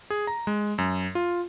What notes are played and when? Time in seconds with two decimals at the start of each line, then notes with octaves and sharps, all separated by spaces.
0.10 G#4
0.27 A#5
0.47 G#3
0.78 F#2
1.15 F4